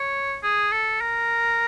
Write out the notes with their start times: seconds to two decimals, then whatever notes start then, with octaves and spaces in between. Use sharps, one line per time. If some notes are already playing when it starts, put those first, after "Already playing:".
Already playing: C#5
0.43 G#4
0.72 A4
1.01 A#4